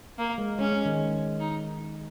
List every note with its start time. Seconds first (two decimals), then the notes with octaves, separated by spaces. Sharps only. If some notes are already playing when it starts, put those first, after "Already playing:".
0.19 A#3
0.38 G#3
0.59 G#3 C#4
0.72 G#3
0.85 D#3
1.40 D#4